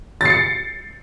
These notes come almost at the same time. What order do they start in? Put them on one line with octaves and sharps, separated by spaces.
A6 C7 C#7